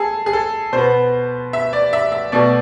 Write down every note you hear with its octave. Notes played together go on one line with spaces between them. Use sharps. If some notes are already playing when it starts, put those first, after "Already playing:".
Already playing: G#4 A4
G#4
A4
B2 C5
B3
E5
D5
E5
E5
B2 A3 D5